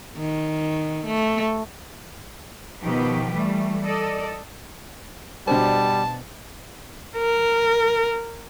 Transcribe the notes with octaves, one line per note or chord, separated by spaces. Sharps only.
D#3
A3
B2 D#3 F3 G4 B4
E3 G3 A3
A4 D5 D#5
B2 G3 D4 C5 A5
A#4